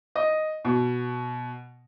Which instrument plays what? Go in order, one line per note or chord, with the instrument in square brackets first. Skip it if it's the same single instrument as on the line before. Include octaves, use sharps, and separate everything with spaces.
[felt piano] D#5
B2